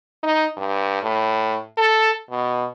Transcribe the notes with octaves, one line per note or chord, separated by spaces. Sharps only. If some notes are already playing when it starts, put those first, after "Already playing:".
D#4
G2
A2
A4
B2